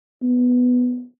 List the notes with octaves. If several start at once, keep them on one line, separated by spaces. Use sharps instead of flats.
B3